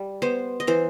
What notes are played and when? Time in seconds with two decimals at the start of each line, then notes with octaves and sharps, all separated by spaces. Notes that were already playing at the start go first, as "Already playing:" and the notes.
Already playing: G3
0.22 B3 C5
0.60 D#5
0.67 E3 C5